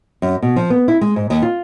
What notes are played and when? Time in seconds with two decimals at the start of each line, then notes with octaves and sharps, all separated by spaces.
0.22 F#2
0.42 B2
0.56 F3
0.70 B3
0.88 E4
1.01 G#3
1.16 G#2
1.30 D#2
1.42 F4